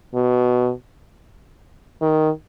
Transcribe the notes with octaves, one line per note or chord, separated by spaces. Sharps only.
B2
D#3